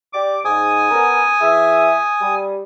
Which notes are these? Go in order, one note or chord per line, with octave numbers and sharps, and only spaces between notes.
G4 D5 D6
G#2 G#5 D#6
B3 C#4 A#4
E3 G#4 E5
G3